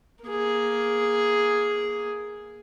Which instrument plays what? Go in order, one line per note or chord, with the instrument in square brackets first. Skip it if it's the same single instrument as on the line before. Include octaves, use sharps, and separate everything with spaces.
[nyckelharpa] A#3 G#4